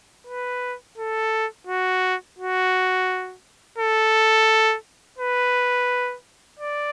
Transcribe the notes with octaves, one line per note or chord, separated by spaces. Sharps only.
B4
A4
F#4
F#4
A4
B4
D5